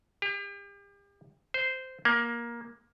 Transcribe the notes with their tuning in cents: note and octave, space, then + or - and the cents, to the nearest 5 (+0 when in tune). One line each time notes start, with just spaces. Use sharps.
G4 +40
C5 -10
A#3 +15